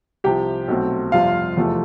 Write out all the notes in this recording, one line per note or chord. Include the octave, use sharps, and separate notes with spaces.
C2 C3 F3 G4 G5
B1 B2 A3 C4
G1 F2 C3 G3 F4 F5
F1 E2 C3 F3 A3